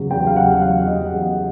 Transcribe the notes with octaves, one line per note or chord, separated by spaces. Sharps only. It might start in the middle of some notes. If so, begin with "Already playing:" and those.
Already playing: E2 C#3 F#3
E2 G5
F5
C#3 F#3 F#5
E2 F5
C#3 F#3 D#5
E2